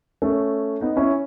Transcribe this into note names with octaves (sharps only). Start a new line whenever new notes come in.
A3 C#4
B3 D#4
C#4 E4